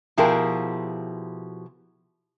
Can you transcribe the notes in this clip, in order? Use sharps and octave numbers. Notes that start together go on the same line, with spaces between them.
B2 F3 E4 G4 G#4 A#4